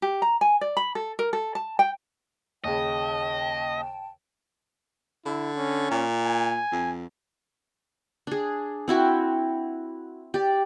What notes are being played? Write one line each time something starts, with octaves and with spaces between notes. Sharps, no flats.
G4
A#5
G#5
D5
B5
A4
A#4
A4
A5
G5
D#2 C#3 D#5 G5 A5
D3 E4
C#4
A#2
G#5
F2
D4 G#4
C4 E4 F#4 G5
G4 D5